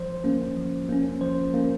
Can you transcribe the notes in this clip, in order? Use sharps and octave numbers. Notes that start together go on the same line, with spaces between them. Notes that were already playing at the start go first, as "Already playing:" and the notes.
Already playing: F3 C5
A#3 C#4
F3
A#3 C#4
F3 C5
A#3 C#4